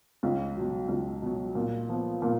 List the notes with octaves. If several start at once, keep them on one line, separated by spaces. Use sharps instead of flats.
C#2
B2 F#3
C#2
B2 F#3
A#2
F3 B3
A#2